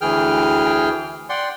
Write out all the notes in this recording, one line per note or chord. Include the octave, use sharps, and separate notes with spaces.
D2 E3 G#4 G5 F6
D5 F#5 G5 C6